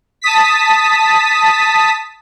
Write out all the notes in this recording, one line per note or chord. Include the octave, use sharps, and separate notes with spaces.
A5 D#6 B6